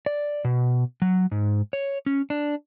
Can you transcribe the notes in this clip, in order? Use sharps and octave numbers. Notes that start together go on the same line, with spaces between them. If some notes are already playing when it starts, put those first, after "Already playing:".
D5
B2
F#3
G#2
C#5
C#4
D4